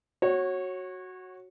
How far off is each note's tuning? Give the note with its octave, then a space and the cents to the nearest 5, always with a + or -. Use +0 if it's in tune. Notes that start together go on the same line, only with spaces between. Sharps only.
F#4 +0 C#5 -20